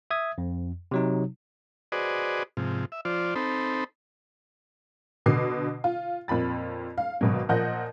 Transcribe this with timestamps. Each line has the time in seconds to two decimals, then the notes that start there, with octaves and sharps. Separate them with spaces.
0.11 E5 D#6 G#6
0.38 F2
0.91 C3 F#3 D#4
1.92 F#4 G#4 B4 C5 D5 D#5
2.57 G#2 C3 F3
2.92 E5
3.05 F3 F4 C5 D5
3.36 C4 D#4 A4 C5 B5
5.26 B2 D3 D6 C7
5.84 F4
6.28 F2 A#2 B5 A6
6.98 F5
7.21 G#1 B2 F#3
7.49 A#2 F3 D#5 F#5 G6